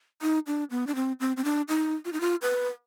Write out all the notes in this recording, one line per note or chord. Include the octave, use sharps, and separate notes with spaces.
D#4
D4
B3
D4
C4
C4
C4
D4
D#4
F4
D#4
F4
B4